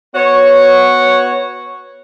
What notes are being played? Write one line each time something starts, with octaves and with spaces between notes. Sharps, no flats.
B3 F#4 C#5